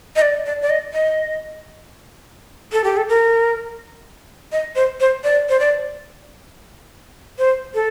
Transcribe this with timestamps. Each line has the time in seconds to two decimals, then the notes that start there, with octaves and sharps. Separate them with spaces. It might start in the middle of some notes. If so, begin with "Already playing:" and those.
0.16 D#5
0.22 D5
0.46 D5
0.62 D5
0.70 D#5
0.93 D#5
2.72 A4
2.84 G4
2.97 A4
3.09 A#4
4.52 D#5
4.76 C5
5.00 C5
5.24 D5
5.49 C5
5.60 D5
7.39 C5
7.75 A4